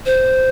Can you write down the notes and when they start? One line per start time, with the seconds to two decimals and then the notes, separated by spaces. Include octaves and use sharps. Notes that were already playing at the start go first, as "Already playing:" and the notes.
0.06 C5